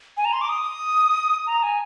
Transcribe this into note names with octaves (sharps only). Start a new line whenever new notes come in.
G#5
A#5
C6
D6
D#6
A#5
G#5